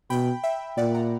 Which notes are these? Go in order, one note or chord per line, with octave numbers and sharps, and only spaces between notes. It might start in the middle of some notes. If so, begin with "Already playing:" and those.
B2 G5 B5
E5 G5
A#2 D5 F#5
F#5 A#5